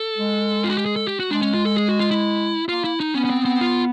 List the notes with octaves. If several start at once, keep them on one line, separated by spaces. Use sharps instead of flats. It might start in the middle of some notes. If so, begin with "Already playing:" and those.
Already playing: A4
G#3
F4
F#4
G4
G#4
A4
G4
F#4
G#3 D4
C#4
F4
A4
G#4
F#4
F4
E4
A#3 F4
E4
D#4
B3 C#4
C#4
C4
B3
C4
F4